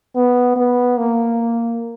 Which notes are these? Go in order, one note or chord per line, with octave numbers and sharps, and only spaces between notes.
B3
B3
A#3